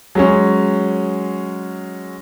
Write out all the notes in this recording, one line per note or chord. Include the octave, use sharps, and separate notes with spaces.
F#3 G#3 C#4